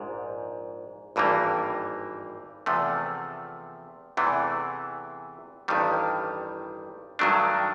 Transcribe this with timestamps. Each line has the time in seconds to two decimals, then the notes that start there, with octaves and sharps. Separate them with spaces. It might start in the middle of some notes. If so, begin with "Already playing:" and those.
Already playing: A#1 G#2
1.16 G#1 G2 E3 G3 A#3
2.66 E2 C3 F3 A3
4.17 E2 C3 E3 A3
5.68 A1 G2 D#3 G3
7.19 G2 D#3 F#3 A3 D4